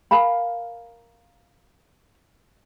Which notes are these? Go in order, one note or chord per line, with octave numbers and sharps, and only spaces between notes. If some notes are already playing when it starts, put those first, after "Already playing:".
A#4 F5 G#5 B5